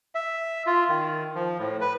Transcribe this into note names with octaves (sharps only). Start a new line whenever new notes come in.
E5
F4
D#3
F3
A2
B4